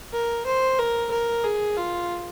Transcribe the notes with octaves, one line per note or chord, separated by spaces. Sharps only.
A#4
C5
A#4
A#4
G#4
F4